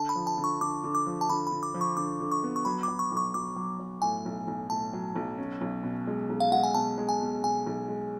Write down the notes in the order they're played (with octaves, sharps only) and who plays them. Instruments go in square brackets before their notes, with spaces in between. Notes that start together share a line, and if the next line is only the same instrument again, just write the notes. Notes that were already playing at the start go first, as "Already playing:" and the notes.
Already playing: [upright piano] D3 [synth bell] A5
[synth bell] B5
[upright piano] F3
[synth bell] A5
[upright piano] D3
[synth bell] C#6
[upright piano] D3 [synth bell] D6
[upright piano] D3
[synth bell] D6
[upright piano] F3
[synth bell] A5
[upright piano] D3 [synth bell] B5
[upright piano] D3 [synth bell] B5
[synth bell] D6
[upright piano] F3
[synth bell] C#6
[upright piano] D3 [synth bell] D6
[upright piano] D3
[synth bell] C#6
[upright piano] B3
[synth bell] C#6
[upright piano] F#3 [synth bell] B5
[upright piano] F#3 [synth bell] D6
[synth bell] C#6
[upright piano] B1
[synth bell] C#6
[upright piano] F#3 [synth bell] D6
[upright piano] F#3
F#3
[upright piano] A2 [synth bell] G#5
[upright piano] B1
B1
[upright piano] A2 [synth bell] A5
[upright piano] F#3
B1
C#4
B1
B2
G#3
B1
[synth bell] F5
[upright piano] G#3 [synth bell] F#5
[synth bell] G#5
[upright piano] B2 [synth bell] A5
[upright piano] G#3
[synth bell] G#5
[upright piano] B2
[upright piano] B2 [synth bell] G#5
[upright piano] B1
G#3